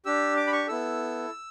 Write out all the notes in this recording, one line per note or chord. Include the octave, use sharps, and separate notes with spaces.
D4 G4 E6
D6
B5
C#6
B3 E4 A4 E6